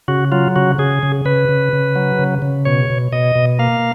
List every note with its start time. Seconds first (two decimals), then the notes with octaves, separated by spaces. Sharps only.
0.08 C#3 F#4
0.32 F#3 F4
0.56 C#3 F#4
0.78 C#3 G#4
1.03 C#3
1.25 C#3 B4
1.49 C#3
1.73 C#3
1.96 F#3
2.19 C#3
2.42 C#3
2.65 B2 C#5
2.90 B2
3.12 B2 D#5
3.36 B2
3.59 A#3 F5